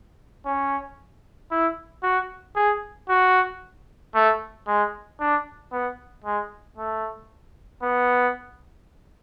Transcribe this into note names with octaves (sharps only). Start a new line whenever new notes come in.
C#4
E4
F#4
G#4
F#4
A3
G#3
D4
B3
G#3
A3
B3